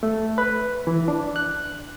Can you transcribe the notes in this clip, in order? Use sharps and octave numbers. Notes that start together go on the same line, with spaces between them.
A3
B4
E3
D4
F#6